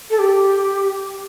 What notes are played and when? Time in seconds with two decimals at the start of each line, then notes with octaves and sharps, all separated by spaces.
0.10 A4
0.19 G4